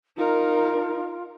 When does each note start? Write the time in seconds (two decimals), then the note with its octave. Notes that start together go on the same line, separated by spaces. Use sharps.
0.17 D#4 F4 A#4